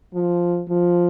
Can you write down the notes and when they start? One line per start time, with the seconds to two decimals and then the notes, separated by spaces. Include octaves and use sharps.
0.14 F3
0.69 F3